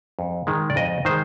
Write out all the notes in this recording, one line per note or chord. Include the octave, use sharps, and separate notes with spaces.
F2
D#3 G#3
D5
F2 D#5
D#3 G#3 C5